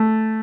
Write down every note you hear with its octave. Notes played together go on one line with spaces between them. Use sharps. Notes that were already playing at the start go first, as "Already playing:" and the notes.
Already playing: A3